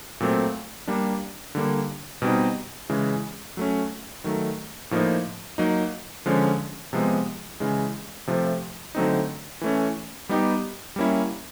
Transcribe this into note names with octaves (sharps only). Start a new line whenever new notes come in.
A#2 F#3 A3 C4
G3 A#3 D4
D3 G3 A#3
B2 G3 C4 D#4
C#3 E3 G#3
F#3 A3 C#4
D#3 F#3 A3
A2 F3 A#3 D#4
F#3 A#3 D#4
D3 F3 G#3 C#4
C3 F3 G#3 B3
C#3 E3 G#3
C3 F3 A3
D3 F#3 A3 C4 D#4
E3 A3 C#4
G3 B3 D#4 G4
G3 A#3 C#4 E4